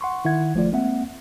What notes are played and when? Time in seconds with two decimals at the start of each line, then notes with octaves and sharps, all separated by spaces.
0.01 F#5 C6 C#6
0.25 D#3 E4 E5 F#5 G#6
0.54 G1 F3 A3 F4 D5
0.72 G#3 A#3 C4 E5 F#5